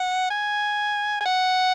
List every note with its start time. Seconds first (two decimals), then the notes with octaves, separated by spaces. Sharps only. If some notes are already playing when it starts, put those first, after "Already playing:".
Already playing: F#5
0.30 G#5
1.21 G#5
1.26 F#5